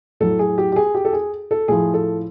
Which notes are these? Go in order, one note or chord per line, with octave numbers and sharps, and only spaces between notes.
A2 F#3 A4
G#4
G4
G4
G#4
G4
A4
G#4
A4
A2 F3 G#4
A4